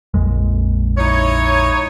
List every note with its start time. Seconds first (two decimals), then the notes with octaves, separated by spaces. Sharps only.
0.14 A#1 F2 G#3
0.98 D#4 E4 C#5